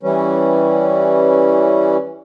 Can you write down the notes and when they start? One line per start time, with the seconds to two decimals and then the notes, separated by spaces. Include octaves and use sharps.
0.03 E3 G3 C#4